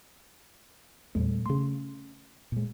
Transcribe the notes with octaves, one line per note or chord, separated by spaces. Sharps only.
E2 A#2 G3 A3
C#3 A3 C#4 C6
A#2 G#3